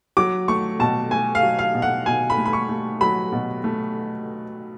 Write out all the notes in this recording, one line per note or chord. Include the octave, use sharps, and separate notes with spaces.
F#3 D6
A3 C#6
B2 A5
A3 G#5
F5
F#3
F5
B2
F#5
B2 G#5
B5
A3
B5
C#6
A3
F#3 B5
B2
A3